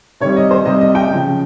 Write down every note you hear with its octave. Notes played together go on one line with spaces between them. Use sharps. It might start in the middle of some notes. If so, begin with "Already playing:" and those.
C3 D#3 G3 C#5
D#5
C5
C3 G3 D#5
D#5
G5
C#3 F3